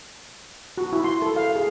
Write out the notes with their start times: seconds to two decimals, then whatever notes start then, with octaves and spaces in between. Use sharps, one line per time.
0.77 F#4
0.93 E4
1.04 C6
1.22 A4
1.36 F5
1.55 G#4